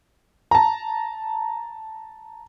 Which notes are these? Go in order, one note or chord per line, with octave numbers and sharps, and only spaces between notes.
A5 A#5